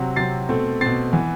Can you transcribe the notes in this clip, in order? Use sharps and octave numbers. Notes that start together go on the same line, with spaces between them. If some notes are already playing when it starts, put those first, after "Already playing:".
Already playing: C3 F#3 C4
C3 F#3 C4 A6 C7
B2 A3 C4
B2 A3 C4 A6 C7
E3 B3